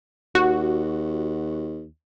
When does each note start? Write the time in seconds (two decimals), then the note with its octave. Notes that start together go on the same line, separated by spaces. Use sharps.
0.35 D#2 F#4